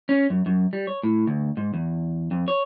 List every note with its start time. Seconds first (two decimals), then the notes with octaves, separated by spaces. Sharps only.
0.09 C#4
0.30 F#2
0.46 F#2
0.73 G3
0.87 C#5
1.03 A2
1.27 D2
1.57 G#2
1.74 E2
2.31 F2
2.48 C#5